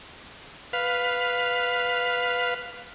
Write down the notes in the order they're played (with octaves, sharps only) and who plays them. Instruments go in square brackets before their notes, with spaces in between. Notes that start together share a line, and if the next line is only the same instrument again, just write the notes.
[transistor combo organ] B4 F5